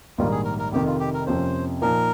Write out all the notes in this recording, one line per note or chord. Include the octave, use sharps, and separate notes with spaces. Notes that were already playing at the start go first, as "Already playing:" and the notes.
A#1 G#2 D#3 G3 A#3 F4
G#4
A#4
A#4
F1 F2 C3 D#3 G4
F4
G4
A#4
F2 C3 F3 A#3 C#4 C5
A#2 F3 A#3 D#4 A#4